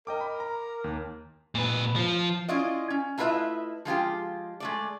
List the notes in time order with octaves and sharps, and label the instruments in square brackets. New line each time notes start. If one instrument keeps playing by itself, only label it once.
[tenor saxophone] A#4 [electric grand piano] D#5 G5 D6
[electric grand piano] B5
A#5
D#2
[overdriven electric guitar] A#2 B4
F3
[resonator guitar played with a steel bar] C#4 E4 F4 D5 D#5
C#4
A3 E4 F4 B4 D#5 E5
F3 G#3 F4 G4
G#3 A3 D5